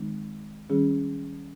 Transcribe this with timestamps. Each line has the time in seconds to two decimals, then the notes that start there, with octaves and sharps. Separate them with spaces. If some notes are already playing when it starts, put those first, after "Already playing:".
Already playing: D#3 G#3 C4 D#4
0.70 D#3 G3 C#4 G#4